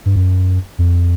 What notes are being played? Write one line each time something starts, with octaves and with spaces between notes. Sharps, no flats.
G2
F#2
F2